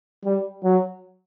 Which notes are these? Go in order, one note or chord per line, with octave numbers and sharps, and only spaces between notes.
G3
F#3